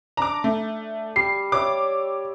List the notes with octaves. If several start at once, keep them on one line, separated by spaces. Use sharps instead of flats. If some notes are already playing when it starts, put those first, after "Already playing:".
D4 A#5 D6
A3
G3 C7
C#5 D5 E5 D6